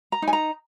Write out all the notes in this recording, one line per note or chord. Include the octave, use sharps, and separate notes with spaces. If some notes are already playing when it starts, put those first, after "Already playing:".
A#5
D#4
G#5
A#5